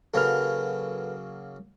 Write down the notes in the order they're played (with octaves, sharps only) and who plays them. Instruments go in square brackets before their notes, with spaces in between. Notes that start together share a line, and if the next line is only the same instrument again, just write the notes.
[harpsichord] C#3 F#3 A#3 [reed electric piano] A4 B4 F6